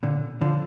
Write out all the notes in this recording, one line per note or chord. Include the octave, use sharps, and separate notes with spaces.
A#2 D3
D3 F3